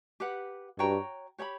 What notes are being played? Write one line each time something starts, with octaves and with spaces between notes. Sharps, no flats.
G4 B4 F#5
G2 F#4 C#5 G5 A#5
G4 C#5 G5 B5